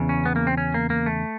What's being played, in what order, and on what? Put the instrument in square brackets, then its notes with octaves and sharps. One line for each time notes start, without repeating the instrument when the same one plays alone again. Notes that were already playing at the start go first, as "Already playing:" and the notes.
Already playing: [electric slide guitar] E2 C#3
C#4
B3
A#3
C4
C#4
A#3
A#3
A3